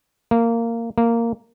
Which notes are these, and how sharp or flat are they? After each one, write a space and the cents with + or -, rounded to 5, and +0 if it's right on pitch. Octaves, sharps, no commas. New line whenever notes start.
A#3 -15
A#3 -10